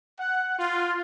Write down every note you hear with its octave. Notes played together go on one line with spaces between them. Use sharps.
F#5
F4